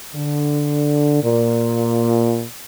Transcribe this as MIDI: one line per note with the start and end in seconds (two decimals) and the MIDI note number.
0.15 1.21 50
1.23 2.43 46